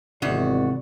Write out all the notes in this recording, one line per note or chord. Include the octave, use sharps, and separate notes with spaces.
G#1 E2 C3 F#4 D5